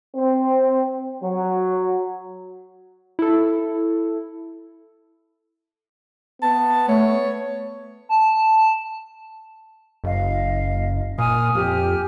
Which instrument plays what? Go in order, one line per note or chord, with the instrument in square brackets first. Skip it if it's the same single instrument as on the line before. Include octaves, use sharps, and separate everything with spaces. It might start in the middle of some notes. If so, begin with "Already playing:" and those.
[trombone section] C4
F#3
[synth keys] E4 A4
[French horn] B3 [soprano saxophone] A5
[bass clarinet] A3 [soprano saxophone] C#5
[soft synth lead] A5
[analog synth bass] F#1 [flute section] D#5 F5
[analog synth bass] A#2 [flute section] G#5 D#6 F6
[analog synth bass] F2 [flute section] G4 G#5 F6